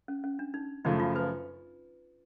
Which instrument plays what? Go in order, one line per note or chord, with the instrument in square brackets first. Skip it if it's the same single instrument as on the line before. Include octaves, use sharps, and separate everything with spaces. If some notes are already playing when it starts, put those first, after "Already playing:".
[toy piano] C#4
C#4
D4
D#4
[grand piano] F#2 C#3 F3 A3 [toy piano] D#4
[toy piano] F4
B4